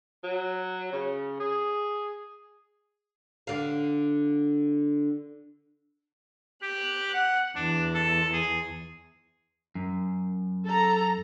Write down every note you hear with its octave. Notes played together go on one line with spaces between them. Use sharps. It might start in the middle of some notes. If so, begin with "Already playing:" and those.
F#3
C#3
G#4
D3 F5
G4 F#6
F#5
E2 D4
A4
G#4
F#2
A4 A#5